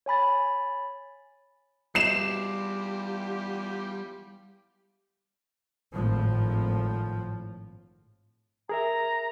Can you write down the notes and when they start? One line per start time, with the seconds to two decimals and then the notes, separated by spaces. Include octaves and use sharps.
0.06 C#5 G#5 B5 A6
1.95 E2 G3 F4 G4 E5 C7 E7
5.93 G#1 A2 F3
8.69 G#4 A#4 E5 A#5